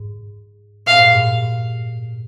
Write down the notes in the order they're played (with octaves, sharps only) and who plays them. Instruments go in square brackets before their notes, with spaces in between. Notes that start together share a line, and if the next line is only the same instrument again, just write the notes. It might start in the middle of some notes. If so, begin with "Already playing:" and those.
Already playing: [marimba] G#2
[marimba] A#2 [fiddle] F5
[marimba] G#2
G2
G#2